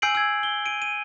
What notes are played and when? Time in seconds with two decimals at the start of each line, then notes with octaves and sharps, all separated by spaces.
0.02 G#5 E6 G6 C7 D7 F#7
0.15 E6 G#6
0.43 G7
0.66 D7 D#7
0.82 D#7